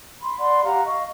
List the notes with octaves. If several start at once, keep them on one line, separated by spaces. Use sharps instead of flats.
B5 C6
D5 F#5 B5 C6
G4 F5 F#5 A#5
D#5 F5 C#6